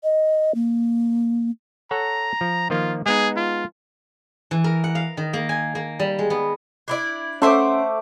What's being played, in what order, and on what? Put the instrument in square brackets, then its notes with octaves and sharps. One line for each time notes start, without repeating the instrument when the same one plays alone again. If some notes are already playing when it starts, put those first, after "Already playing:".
[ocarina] D#5
A#3
[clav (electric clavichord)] A4 C#5 F#5 [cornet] A#5
[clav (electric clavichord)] F3
[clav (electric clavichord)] D#3 F3 A#3 [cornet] F4
[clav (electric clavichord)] G#3 B3 D#4 [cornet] G#4
[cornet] F4
[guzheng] E3
A#4
F#5
F5
D#3
A#3
G#5
A#3
G3
G#3
B3
[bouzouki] D4 E4 D5
[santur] A3 D6 [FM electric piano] C#4 C6 [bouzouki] C5 E5 F#5